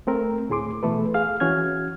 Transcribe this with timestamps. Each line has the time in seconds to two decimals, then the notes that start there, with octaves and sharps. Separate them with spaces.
0.07 A3 C4 A#4
0.49 D2 A2 G#4 C6 D6
0.83 B2 E3 A3 A4 B4
1.14 G#4 F5 F6
1.40 E3 C#4 F#4 F6 G#6